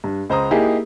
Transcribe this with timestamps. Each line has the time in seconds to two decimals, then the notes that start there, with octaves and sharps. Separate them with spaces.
0.04 G2
0.29 C#2 C5 A#5 D#6
0.51 A#3 D#4 E4 G4 G#4